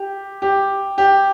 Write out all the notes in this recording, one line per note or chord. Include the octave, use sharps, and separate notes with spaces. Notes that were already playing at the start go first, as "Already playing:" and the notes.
Already playing: G4
G4
G4